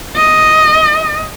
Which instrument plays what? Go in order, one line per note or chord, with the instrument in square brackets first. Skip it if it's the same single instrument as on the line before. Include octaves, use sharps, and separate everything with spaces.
[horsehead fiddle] D#5